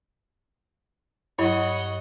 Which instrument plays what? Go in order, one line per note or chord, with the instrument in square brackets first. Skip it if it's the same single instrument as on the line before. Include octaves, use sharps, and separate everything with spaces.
[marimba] G2 F#3 [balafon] E4 [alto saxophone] C#5 [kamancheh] D#5 F#5